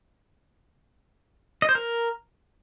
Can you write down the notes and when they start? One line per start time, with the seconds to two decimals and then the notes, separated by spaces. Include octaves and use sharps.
1.62 D#5
1.69 C5
1.75 A#4